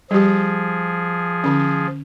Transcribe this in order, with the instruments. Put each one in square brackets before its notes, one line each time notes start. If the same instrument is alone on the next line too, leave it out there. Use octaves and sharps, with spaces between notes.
[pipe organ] F3 G#4 [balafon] G3 G4
[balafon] D3 C#4